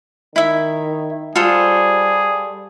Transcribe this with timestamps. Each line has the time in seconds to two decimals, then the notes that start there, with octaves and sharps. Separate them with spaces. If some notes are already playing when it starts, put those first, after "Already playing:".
0.36 D#3 E4 E5
1.36 G3 F4 G#4 A4 C5